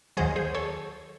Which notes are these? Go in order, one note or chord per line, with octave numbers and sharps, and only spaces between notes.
D#2 D#3 F#3 G#4 C5
G#4 C5
A4 C#5